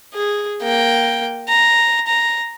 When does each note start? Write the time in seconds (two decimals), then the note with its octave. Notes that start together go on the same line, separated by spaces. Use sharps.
0.14 G#4
0.62 A#3 G5
1.49 A#5
2.07 A#5